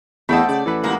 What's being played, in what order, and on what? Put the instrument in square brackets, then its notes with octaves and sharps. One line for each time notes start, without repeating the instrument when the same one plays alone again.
[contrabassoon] E2 [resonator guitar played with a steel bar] A3 A5 [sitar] A#3 C4 [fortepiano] D#5 G5 B5
[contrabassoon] C#3 [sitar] D5
[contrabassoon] A1 [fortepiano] E3 A4 B4
[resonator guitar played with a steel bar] G#3 A#3 [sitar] D#4 F#4 G4